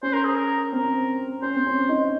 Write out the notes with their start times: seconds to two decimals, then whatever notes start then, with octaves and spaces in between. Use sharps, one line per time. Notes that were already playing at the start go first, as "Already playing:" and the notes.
0.03 C#4 C5
0.13 A#4
0.24 G#4
0.35 A#4
0.72 C4 A#4
1.42 C#4 C5
1.55 C4
1.66 C#4
1.89 D#4